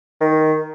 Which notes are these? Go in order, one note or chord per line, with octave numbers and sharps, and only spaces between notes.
D#3